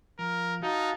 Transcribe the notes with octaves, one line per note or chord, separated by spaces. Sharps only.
F3 A#4
D#4 F#4 F5 A5